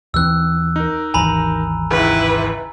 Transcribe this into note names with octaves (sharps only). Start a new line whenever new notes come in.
D#2 E3 C4 E6 F#6
D#4 A#4
G#1 D#2 E3 G#5 A#5 B5
C#2 G#2 E4 B4